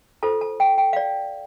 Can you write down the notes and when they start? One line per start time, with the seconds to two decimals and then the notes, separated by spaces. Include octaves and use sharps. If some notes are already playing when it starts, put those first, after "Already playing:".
0.23 F4 A4 C5 A5
0.41 A5
0.60 G5
0.78 G5
0.93 F5
0.96 D5